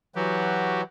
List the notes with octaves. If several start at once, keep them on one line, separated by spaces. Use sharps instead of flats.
E3 F#3 F#4 G4